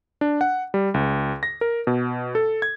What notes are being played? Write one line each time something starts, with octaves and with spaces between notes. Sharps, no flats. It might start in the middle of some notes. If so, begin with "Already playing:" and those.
D4
F#5
G3
C#2
A#6
A#4
B2
A4
G#6